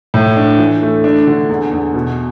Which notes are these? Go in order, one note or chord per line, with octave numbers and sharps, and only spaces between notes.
A2
D4
E3
A3
D4
D3
E2
E2
B2